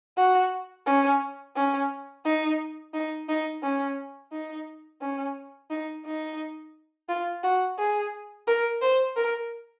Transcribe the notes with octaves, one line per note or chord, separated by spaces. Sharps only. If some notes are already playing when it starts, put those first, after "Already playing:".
F#4
C#4
C#4
D#4
D#4
D#4
C#4
D#4
C#4
D#4
D#4
F4
F#4
G#4
A#4
C5
A#4